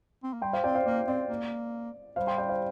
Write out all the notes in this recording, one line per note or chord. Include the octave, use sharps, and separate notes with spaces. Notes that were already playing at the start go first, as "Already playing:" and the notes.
C4
A#3
G3 G5 C6
C5 F5
C4 D5 G5
C5 F5
A#3 D5
C4 D5
A#3
G3 C5 F5
G5 C6
D5 G5
C5 F5